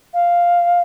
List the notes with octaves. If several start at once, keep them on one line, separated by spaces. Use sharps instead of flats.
F5